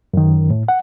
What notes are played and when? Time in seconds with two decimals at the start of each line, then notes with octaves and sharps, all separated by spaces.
0.14 F#2 D#3
0.50 A2
0.68 F#5